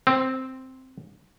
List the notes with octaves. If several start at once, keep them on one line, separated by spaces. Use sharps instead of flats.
C4